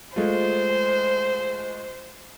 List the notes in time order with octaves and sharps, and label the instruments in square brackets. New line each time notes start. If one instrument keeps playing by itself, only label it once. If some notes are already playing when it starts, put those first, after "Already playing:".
[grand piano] G#3 A3 F4 [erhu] C5